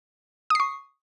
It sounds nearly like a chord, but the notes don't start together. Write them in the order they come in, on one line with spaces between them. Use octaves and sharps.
D#6 C7 C#6